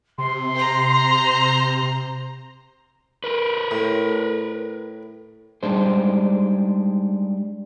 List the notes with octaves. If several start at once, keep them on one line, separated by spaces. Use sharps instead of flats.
C3 C6
C5 A#5
A#4 B4
A2
G3 G#3 D4 D#4 C5